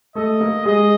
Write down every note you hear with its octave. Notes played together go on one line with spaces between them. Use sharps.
A3 A4 D#5
A#3 A#4
G#3 G#4 D#5